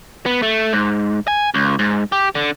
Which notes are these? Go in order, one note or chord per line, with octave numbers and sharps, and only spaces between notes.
B3
A3
G#2
G#5
C#2
G#2
G4
D3